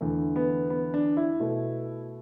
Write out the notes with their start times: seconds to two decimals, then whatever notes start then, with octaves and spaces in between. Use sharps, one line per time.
0.01 E2 D3 A3
0.36 B3
0.70 B3
0.94 D4
1.17 E4
1.40 B2 A3